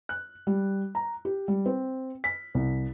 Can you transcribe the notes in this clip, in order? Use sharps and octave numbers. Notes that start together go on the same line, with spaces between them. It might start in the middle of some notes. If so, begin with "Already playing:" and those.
F#6
G3
A#5
G4
G3
C4
B6
C2